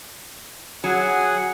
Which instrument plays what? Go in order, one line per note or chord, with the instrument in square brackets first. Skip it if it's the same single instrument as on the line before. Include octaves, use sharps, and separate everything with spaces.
[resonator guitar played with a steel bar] F#3 [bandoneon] G#4 F#5 G#5